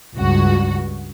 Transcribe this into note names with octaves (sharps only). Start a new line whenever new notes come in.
C#2 G2 F#4